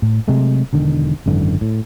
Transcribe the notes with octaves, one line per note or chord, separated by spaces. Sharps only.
A2
C3 F#3 G#3 A3
E1 D3 D#3
G#1 F#2 D3 E3
A2